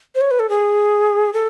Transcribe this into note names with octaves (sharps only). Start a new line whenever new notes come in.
C5
C#5
B4
A4
G#4
A4